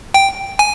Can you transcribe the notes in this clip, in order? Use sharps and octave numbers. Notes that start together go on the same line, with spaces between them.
G5
G#5